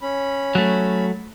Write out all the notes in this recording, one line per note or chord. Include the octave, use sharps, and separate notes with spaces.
C#4 B5
F#3 A3